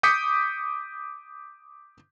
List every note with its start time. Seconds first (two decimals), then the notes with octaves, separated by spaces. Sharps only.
0.03 D6 D#6 G6 B6 C#7